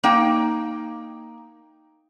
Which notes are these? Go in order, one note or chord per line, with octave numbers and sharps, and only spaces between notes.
A#3 D#4 G5